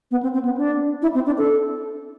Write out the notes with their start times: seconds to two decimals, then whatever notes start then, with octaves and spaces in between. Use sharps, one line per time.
0.11 B3
0.23 C4
0.33 C4
0.45 B3
0.57 D4
1.02 E4
1.14 C4
1.26 D4
1.38 A4